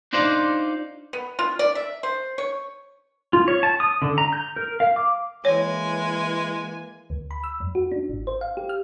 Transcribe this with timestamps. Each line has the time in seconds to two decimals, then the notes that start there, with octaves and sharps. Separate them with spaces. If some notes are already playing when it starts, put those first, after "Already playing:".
0.13 D4 D#4 F4 C5 D5
1.13 B3
1.39 F4
1.59 D5
1.75 E5
2.03 C5
2.38 C#5
3.33 F4
3.48 C#5
3.63 A5
3.80 D#6
4.02 D3
4.18 A#5
4.33 G6
4.56 A#4
4.80 F5
4.96 D6
5.45 E3 G#3 A#3 C#5 G#5
7.10 D2
7.31 B5
7.44 E6
7.60 F2
7.75 F#4
7.92 D4
8.09 G#1
8.27 C5
8.41 F5
8.57 G4
8.69 F6